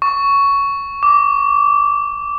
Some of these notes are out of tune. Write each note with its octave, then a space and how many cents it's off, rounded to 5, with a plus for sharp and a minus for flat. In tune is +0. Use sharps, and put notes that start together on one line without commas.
C#6 +10
D6 -15